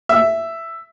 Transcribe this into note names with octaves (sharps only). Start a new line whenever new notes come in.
E5